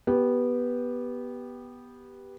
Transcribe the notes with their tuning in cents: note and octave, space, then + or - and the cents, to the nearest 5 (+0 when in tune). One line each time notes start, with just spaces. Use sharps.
B3 -10 G4 +0